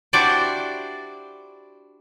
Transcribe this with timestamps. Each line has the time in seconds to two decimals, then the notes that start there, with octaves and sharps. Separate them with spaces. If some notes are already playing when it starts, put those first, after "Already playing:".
0.13 D4 E4 F#4 G4 C5 D5